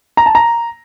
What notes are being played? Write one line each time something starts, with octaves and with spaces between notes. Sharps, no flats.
A#5
A5
A#5